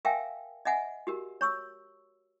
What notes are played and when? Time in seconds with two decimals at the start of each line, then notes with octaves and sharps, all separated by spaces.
0.05 A#4 E5 F5 G5 G#5
0.65 D#5 E5 F#5 G#5
1.07 F#4 G4 A#4
1.41 C#5 C#6 E6